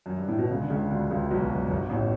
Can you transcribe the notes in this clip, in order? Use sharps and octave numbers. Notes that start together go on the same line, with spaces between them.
F#2
G2
A2
B2
C#2 C#3
D3
C#2 C#3
D2 D3
C#2 C#3
B1 B2
F#2
F#2
G1 G2
A1 A2